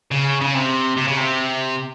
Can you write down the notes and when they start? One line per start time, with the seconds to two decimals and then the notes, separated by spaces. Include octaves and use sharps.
0.11 C#3
0.41 C#3
0.54 C3
0.97 C3
1.07 C#3
1.17 C3